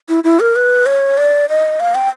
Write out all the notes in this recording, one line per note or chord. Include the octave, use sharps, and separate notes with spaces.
E4
E4
A#4
B4
C#5
D5
D#5
F5
G5